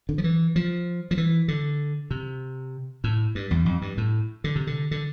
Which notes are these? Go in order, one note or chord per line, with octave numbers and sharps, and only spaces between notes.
D3
F3
E3
F3
F3
E3
D3
C3
A2
G2
E2
F2
G2
A2
D3
C3
D3
D3